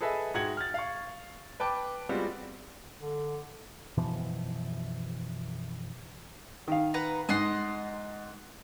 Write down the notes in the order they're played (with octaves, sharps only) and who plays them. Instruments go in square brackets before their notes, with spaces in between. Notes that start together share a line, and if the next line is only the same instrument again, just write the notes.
[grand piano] G#4 A4 B4 D#5 E5 G#5
G#2 F#4 F#5 G5 G#6 F#7
F6 A6
F5 C#6
B4 G5 A5 D6
G3 G#3 B3 C4 F4 F#4
[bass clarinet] D3
[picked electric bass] F#2 B2 E3 F3
[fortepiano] D#3 F5
[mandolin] B4 F#5 A#5
[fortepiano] G#2 [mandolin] D#5 F#5 C6